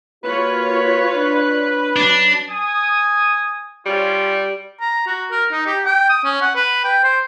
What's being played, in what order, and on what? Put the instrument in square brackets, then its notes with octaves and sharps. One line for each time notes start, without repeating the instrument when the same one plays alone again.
[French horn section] A#3 F#4 [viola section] F4 C#5 [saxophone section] B4
[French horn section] D4
[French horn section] F#3 [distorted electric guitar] D4
[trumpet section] G#5 D#6
[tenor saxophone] G3 [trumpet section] C#4 F4
[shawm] A#5
F#4
A#4
D#4
G4
G5
D#6
C#4
F#5
B4
G5
C5